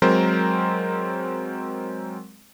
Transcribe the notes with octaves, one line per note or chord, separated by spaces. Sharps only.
F#3 G#3 C4 A#4 C5